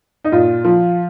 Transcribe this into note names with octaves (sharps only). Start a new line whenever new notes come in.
D#4
A#2 F4
F3